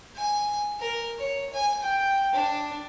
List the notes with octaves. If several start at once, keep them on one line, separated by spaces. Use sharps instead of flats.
G#5
A#4
C#5
G#5
G5
D4